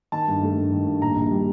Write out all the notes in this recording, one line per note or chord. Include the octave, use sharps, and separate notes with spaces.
D#3 A5
G2
A3
G2
D#3
G2
A#2 A#5
A#1
G3